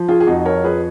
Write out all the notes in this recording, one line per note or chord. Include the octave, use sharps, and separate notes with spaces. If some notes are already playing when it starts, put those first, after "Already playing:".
Already playing: F3
F4 G#4
G#4
F2 D#4 F#4
A#4 C#5
F3 G#4 B4